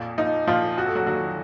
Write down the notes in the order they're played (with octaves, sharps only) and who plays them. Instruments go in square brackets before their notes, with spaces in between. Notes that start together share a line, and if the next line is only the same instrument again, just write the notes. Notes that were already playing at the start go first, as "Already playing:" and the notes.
Already playing: [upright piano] F2 A#2
F3 D#4
A#2 F3 F4
F2 F#4
A4
F#3 F#4
D#3 F#3 F#4